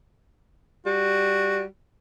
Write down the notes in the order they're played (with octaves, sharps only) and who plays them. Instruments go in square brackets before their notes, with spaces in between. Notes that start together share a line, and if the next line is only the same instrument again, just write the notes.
[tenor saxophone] G3 [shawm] F#4